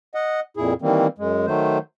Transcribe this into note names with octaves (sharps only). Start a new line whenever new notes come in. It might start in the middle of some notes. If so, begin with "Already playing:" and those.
D#5 F#5
F2 A#2 E4 G#4
D#3 E3 G3 A#3 C4
F#2 G#3
D#3 F#3 A3 C5